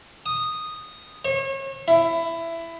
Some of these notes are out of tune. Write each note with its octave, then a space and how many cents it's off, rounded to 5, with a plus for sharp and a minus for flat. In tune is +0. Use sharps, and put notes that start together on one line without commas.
D#6 -5
C#5 -35
E4 +15